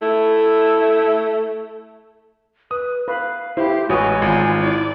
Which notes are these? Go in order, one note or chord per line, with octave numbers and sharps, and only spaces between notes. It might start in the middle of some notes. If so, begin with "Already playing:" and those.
A3 E4
B4 D#6
B4 F5
E4 G4 C5
A1 G#3 F#4 B4 C#5 G#5 D#6
G#1 F4
E4 D5